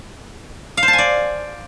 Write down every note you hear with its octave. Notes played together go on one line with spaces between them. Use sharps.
F5
C5
A5
G#5
D5